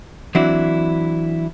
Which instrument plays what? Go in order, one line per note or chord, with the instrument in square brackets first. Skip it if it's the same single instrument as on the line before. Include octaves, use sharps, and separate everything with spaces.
[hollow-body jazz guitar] E3 F#3 C4 D4 E4 F#4